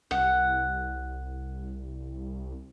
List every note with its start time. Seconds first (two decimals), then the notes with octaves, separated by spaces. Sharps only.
0.11 C2 F#5